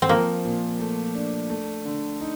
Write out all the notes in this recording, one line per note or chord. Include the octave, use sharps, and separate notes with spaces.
C4
F3 A#3
A#2
A3
D4
A3
D3
D#4